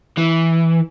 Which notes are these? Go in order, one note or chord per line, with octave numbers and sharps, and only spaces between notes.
E3